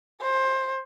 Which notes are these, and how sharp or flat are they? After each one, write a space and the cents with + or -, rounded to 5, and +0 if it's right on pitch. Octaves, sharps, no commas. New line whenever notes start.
C5 +20